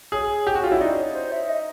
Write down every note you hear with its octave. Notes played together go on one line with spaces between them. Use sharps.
G#4 C#5
G4
F#4
F4
E4 C#5
D#4 D5
C#5
C5
E5
D#5